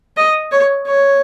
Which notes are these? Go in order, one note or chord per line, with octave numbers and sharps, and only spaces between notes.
D#5
C#5
C#5